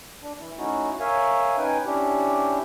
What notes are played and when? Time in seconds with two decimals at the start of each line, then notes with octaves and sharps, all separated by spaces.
0.22 D4
0.39 E3 E4
0.58 A3 C#4 D#4 E4 F#4
1.00 A#4 C#5 E5 F5 G#5
1.58 C#4 D#4 B4 G5 G#5
1.86 C#4 D4 E4 G4